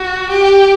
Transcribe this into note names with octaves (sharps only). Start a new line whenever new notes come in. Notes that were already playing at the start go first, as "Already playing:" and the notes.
Already playing: F#4
G4